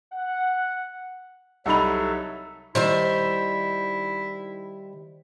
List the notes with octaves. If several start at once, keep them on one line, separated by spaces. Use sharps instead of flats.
F#5
C2 F#3 D#4 A4 E5 F#5 B5 F7
D#3 G3 E4 C5 E5